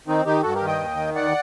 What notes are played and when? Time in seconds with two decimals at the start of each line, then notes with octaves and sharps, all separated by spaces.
0.07 D#3 C4 D#4
0.25 D#3 D#4 G4
0.43 G2 F#4 A4
0.55 G4 A#4
0.61 D#3
0.67 D#5 G5
0.79 D#2
0.97 D#3
1.15 D#2 D5 F#5